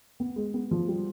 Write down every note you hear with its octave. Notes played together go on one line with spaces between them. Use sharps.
B3
G#3
B3
F3
G3